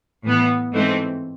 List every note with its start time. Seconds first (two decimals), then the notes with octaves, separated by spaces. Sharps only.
0.24 A2 E3 B3
0.72 G#2 E3 A3 C4